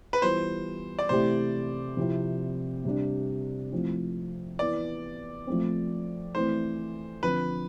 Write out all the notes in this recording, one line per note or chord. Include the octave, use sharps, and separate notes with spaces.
B4
E3 G3 B3 F4 C5
D5
C3 E3 A3 E4 G4 C5
C3 F3 C4 E4
C3 G3 D4 G4
F3 A3 C4 E4
E3 B3 E4 D5
F3 A3 C4
E3 A3 C4 C5
D3 F3 C4 B4